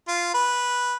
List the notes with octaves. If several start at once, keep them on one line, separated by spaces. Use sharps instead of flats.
F4
B4